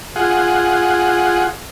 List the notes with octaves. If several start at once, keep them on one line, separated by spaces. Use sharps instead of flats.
F4 G#4 F#5